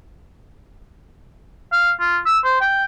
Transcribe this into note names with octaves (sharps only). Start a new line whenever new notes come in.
F5
F4
E6
C5
G5